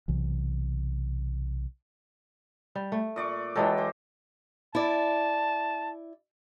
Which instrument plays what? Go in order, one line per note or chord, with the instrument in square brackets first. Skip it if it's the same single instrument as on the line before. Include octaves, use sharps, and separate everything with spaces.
[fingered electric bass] B1 C3 E3
[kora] G3
A3
[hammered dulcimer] A#2 D5 C#6
[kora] E3 G#3 A4 [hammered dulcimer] F#3 G5 A5
[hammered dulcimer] C5 D6
[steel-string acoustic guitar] E4 D5 [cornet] A5